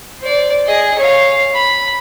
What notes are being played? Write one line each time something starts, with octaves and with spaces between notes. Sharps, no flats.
C5 D5
G#4 D#5
C#5 F5
B5